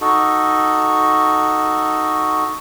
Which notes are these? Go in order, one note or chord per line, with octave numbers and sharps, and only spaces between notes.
D#4 F#4 A4